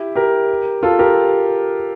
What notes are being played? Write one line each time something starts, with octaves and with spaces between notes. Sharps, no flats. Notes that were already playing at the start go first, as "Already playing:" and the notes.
Already playing: E4 G4
G4 A#4
F4 A4
G4 A#4